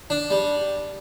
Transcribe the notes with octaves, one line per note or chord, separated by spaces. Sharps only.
D4
G3